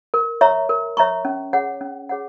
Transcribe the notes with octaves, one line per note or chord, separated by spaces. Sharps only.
A#4
C#5 E5 A#5 C#6
A#4
C#5 E5 A#5 C#6
C#4
G#4 C#5 F#5
C#4
G#4 C#5 F#5